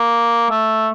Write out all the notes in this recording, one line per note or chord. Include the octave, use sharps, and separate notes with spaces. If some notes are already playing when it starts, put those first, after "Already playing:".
Already playing: A#3
A3